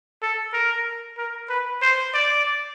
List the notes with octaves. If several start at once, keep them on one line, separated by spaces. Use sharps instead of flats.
A4
A#4
A#4
B4
C5
D5